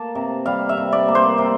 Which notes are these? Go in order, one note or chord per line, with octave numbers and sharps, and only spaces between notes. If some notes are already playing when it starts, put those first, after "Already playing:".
Already playing: A#3 A5
C3
G3 F5
E5
C3
D5
A#3
C5
C3